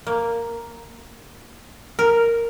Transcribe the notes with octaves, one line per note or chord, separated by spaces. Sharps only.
A#3
A#4